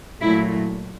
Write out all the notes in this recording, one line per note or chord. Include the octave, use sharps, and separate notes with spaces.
A#2 F#3 A3 E4